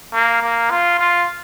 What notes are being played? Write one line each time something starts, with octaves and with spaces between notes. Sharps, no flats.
A#3
A#3
F4
F4